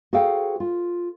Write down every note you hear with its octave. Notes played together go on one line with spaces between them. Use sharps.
F#4 G#4 A4 C5 F5 G5
F4